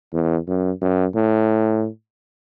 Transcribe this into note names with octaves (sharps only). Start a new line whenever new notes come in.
E2
F#2
F#2
A2